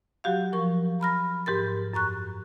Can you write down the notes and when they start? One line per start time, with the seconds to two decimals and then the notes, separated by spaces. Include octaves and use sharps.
0.24 F#3 F#4 G4 F5
0.53 F3 A#4 C#6
1.00 A#5 B5 F6 A#6
1.46 G#2 G4 A#4 A6
1.93 F#2 A#5 C#6 F#6